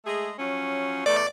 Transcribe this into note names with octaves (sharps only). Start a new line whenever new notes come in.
G#3 A3 G#4
F3 F#3 C#4
E2 A3 D5